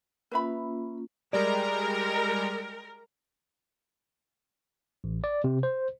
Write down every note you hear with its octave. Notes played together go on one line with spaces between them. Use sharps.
A#3 C#4 F4 B4 E5 B5
G3 G#3 A#4 D5 A#5
A1
D5
C3
C5